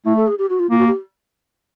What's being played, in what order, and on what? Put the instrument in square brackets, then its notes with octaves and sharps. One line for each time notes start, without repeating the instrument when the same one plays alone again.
[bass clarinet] A3 [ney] E4
[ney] A4
G#4
G4
F#4
F4
[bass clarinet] A#3 [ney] F4
[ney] F#4
G4